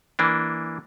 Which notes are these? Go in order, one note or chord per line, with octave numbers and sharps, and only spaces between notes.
E3 A#3 D4